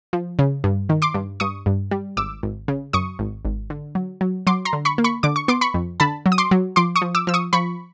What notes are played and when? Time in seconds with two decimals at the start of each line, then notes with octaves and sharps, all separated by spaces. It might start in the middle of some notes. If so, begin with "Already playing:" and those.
0.13 F3
0.39 C#3
0.64 G2
0.89 D#3
1.02 C6 D6
1.14 G2
1.40 G2 C#6 D#6
1.66 G2
1.91 G3
2.17 G#1 D6 E6
2.43 G#1
2.68 C#3
2.93 F#2 C#6 D#6
3.19 G#1
3.45 G#1
3.70 D3
3.95 F#3
4.21 F#3
4.47 F#3 C6 D6
4.65 A#5 C6
4.73 D3
4.85 B5 C#6
4.98 A#3
5.04 B5 C#6
5.23 D3 D6
5.36 C#6
5.48 B3 C6 D6
5.61 B5 C#6
5.74 F2
6.00 D3 A5 B5
6.26 F#3
6.32 D#6
6.38 C6 D6
6.51 F#3
6.76 F3 C6 D6
6.96 C#6 D#6
7.02 F3
7.15 D6 E6
7.27 F3 E6
7.34 C#6 D#6
7.53 F3 B5 C#6